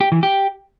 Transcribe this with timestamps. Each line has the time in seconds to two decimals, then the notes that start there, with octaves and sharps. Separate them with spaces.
0.01 G4
0.12 E3
0.23 G4